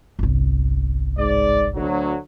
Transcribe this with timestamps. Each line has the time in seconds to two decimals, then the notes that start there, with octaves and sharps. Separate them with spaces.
0.19 G1 C2
1.18 G#2 D5
1.76 D2 F#3